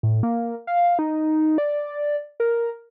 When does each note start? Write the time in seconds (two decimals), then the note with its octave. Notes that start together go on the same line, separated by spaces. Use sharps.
0.03 A2
0.23 A#3
0.67 F5
0.99 D#4
1.58 D5
2.40 A#4